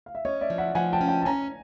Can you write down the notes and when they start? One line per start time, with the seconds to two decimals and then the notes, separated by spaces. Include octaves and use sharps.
0.06 F5
0.15 E5
0.25 C#4 C#5 D#5
0.41 D5 E5
0.50 F3
0.58 E5 F#5
0.75 F3 F#5 G#5
0.93 G5 A5
1.01 C#4
1.08 G5 A5
1.22 A5
1.25 C#4 G#5 A#5